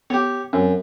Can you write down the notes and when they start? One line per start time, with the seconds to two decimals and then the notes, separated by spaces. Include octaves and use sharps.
0.10 B3 G4 C#5
0.53 F#2 C4